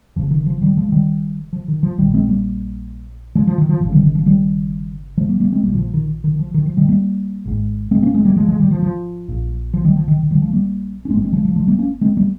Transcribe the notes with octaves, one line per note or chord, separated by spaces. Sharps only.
F1 F2 C#3 F3
D#3
F3
D#3 G3
F3 G#3
D#3 G3
F3
D#3
F3
A#1 A#2 D#3 G3
G#3 C4
G3 A#3
F3 G#3
F3
D#3
F3
G1 F2 C#3 F3
D#3 G3
D#3
F3
D#3 G3
F3 G#3
G3 A#3
G3 A#3
G#3 C4
A#1 A#2 G3 A#3
D#3
F3
D#3
D#3
F3
D#3
F3
D#3 G3
G3 A#3
G#1 G#2
G#3 C4
A#3 C#4
G#3 C4
G3 A#3
F3 G#3
F3 G#3
D#3 G3
F3
F3
A#1 A#2
F3
D#3 G3
F3
D#3
D#3
D#3 G3
F3 G#3
G3 A#3
C#4
G1 G2 G#3 A#3 C4
G#3 C4
F3 G#3
F3
F3 G#3
G3 A#3
A#3 C#4
G#3 C4
G3 A#3